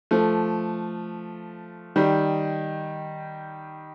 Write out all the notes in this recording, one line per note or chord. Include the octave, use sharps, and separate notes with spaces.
F3 A3
D#3 G3